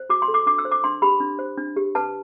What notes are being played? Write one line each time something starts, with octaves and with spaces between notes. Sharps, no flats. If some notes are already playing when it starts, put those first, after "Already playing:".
Already playing: C5
F#4 D6
C6
A4
D6
D4 D6
E6
C5
D6
D4 C6
G4 B5
D4
C5
D4
G4
B4 A5